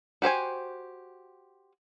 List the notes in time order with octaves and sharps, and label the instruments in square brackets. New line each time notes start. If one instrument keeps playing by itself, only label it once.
[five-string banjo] F#4 G4 C5 G#5